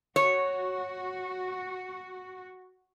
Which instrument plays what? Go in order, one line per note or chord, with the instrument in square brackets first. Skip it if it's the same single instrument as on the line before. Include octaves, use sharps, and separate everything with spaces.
[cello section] F#4 [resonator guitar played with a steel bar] C#5